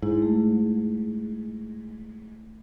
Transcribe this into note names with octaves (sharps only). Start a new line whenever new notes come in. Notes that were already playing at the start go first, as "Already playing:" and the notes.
G#2 E4
A3